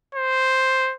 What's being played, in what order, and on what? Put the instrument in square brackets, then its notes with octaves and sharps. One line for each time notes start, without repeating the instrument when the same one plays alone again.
[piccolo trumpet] C5